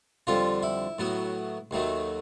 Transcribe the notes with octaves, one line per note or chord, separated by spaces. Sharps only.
F2 D3 G3 F4
E4
A2 F#3 B3
D#2 D#3 F#3 A3